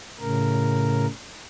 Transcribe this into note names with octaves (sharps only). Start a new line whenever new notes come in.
A2 C#3 A#4